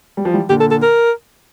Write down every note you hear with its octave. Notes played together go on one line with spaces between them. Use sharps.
G3
F3
E3 G3
A#2 D3 G4
A4
A4
A#4